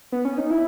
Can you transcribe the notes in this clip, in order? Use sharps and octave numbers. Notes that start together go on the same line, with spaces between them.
B3
C#4
D#4
E4